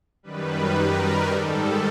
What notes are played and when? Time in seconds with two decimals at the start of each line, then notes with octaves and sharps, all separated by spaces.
0.23 F#2 D#3 G3 B4
0.76 A#4
1.28 G#2 D#3 G3 A4